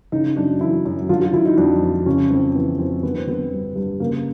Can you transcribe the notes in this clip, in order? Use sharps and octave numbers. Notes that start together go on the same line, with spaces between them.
C#3 D#4
F#2 D4
E3 E4
F#2
D3 F4
F4
D3 E4
D#4
F2 D4
F2
C#3 C#4
F2 C4
E3 B3
F2 C4
D3 B3
C4
D3 B3
G2
G2
C#3 A#3